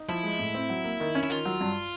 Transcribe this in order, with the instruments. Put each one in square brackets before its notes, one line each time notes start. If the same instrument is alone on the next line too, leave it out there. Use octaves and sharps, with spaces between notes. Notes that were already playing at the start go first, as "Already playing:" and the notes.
Already playing: [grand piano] D#4
[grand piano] F3 [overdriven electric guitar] E4
[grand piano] G#3
A2
C4
F#3
A#3
D#3
C#4
[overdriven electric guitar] E4
[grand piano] D#3 [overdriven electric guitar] F4
[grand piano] F#3
G2